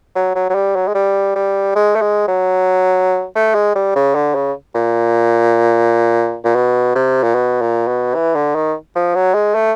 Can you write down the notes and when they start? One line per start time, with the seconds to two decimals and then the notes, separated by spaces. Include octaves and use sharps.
0.15 F#3
0.35 F#3
0.49 F#3
0.55 G3
0.75 F#3
0.88 G#3
0.94 G3
1.35 G3
1.76 G#3
1.95 A3
2.01 G#3
2.28 F#3
3.35 A3
3.55 G#3
3.75 G3
3.96 C#3
4.15 D3
4.35 C#3
4.75 A#2
6.44 A#2
6.55 B2
6.95 C3
7.23 A#2
7.35 B2
7.61 A#2
7.88 B2
8.15 E3
8.35 D3
8.55 D#3
8.95 F3
9.15 F#3
9.34 G#3
9.55 A3